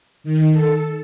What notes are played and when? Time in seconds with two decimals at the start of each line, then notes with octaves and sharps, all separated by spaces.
0.24 D#3
0.52 A4